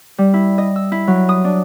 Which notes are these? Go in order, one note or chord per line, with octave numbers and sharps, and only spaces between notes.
G3
E4
D#5
E6
E4
F#3
D#6
D4